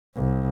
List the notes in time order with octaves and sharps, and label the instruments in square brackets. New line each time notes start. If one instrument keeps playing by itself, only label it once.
[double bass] C2